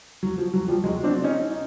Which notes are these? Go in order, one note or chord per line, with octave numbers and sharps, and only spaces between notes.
F#3
F3
F#3
F3 G3
F#3 G#3
C4 D4
C#4 D#4
D#4